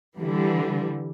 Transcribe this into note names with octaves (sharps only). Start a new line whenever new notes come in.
D3 E3 G3